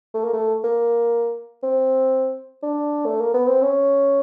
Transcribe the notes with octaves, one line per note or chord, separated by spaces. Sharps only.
A3
A#3
A3
A#3
C4
D4
A3
A#3
B3
C4
C#4